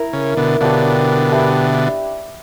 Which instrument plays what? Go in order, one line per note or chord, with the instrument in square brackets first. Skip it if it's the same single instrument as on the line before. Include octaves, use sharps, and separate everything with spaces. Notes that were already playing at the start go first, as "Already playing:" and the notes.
Already playing: [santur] E4 A#4 E5
[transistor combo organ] C#3
B2 D3
[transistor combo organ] B2 D3 [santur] A#3 D4 G4 C#5
[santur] D4 G4 B4 E5